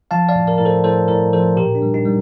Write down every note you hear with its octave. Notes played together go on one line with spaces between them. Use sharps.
F3 F5 A5
D5 F5
A2
A#4 D5
A2 A#4
A4 C5
A2 A4 C5
A2 A#4 D5
F3 A4 C5
A#2 G4 A#4
D4
G3
D#4
G3